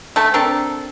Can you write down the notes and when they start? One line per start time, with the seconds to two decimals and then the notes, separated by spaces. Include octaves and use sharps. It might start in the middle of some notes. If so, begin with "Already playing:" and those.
0.16 A3 A4 A5
0.34 C4 D4 A4 A#4